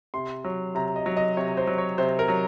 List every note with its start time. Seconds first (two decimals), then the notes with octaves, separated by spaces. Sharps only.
0.14 C3 C6
0.44 F#3
0.75 C3 A#5
0.96 D#5
1.06 F#3
1.17 D#5
1.37 C3 C#5
1.57 C5
1.67 F#3
1.78 C#5
1.98 C3 C5
2.19 A#4
2.28 F#3